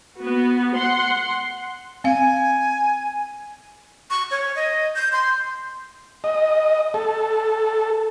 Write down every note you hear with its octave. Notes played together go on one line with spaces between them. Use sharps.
B3 F#4
F#5 C6
C4 F5 G#5
C#6
C#5
D#5
G6
C6
D#5
A4